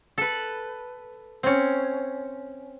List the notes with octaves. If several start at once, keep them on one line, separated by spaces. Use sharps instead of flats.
A4 B4
C4 C#4